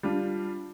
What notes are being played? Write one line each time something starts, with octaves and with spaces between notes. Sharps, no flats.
G3 D4 F4